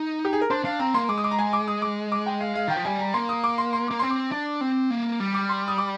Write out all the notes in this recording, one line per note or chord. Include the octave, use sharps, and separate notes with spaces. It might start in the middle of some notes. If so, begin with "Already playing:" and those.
Already playing: D#4
G4
G#4
A#4
D4 C5
D4 F5
C4 A#5
A#3 C6
G#3 D6
D#6
D6
A#5
G#5
D6
D#6
D6
D6
G5
F5
F5
D#3 G5
F3
G3 G#5
A#5
A#3 C6
D#6
D6
C6
C6
A#3 D6
C4 C6
D6
D4
C4
A#3
G3
D6
C6
D#6
D6